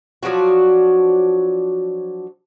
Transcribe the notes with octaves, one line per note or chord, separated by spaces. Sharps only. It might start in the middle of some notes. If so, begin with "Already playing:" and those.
F3 F#3 D4 F#4